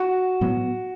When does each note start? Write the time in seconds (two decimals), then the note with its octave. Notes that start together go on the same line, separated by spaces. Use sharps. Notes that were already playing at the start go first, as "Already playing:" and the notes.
Already playing: F#4
0.41 A2 F#3 B3